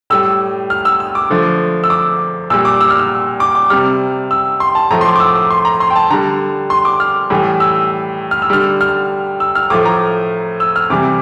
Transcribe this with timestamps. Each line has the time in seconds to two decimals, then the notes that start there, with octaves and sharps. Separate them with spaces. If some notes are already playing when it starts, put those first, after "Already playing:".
0.10 A2 G3 E6
0.70 F6
0.85 E6
1.00 E6
1.15 D6
1.30 D3 F3 A3
1.84 E6
1.90 D6
2.50 A#2 G3 E6
2.65 D6
2.81 E6
2.90 F6
2.99 E6
3.40 D6
3.55 D6
3.70 C3 G3 F6
4.31 E6
4.60 C6
4.75 A5
4.91 A2 F3 A3 A#5
5.01 C6
5.05 D6
5.16 D6
5.20 E6
5.36 D6
5.50 C6
5.65 A#5
5.80 C6
5.90 G5
5.96 A5
6.10 D3 A#5
6.13 G3
6.70 C6
6.85 D6
7.00 F6
7.30 A2 E3 G3
7.60 E6
8.31 F6
8.42 E6
8.50 D3 G3 F6
8.81 F6
9.40 E6
9.55 F6
9.70 A2 F3 A3 D6
9.85 A#5
10.60 E6
10.76 F6
10.90 C3 E3 G3 D6